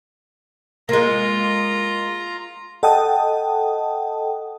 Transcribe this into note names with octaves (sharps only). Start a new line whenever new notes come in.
G#3 A#3 F4 A#5
A4 D#5 F#5 G5 A5 D#6